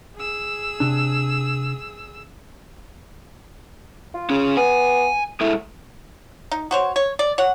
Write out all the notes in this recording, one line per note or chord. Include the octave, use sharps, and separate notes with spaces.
G#4 E6
C3 D4
F4
C#4 G#4
B3 G#5
G#3 A3 E4
D#4
F#4 C5 C#5
C#5
D5
C#5 F#5